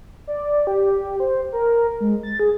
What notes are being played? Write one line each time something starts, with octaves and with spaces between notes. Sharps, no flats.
D5
G4
C5
A#4
G#3
A6
G#4